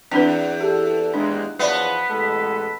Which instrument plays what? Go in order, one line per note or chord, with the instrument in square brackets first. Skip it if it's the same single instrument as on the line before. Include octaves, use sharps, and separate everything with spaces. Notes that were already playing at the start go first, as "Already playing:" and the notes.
[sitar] E2 [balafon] C4 D4 B4
[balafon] G4 [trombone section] A4
[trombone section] D#2 G#3 [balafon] D4
[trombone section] E2 F3 F#4 [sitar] B3 [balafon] C#5 D5 E5
[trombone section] A1 G#3 A4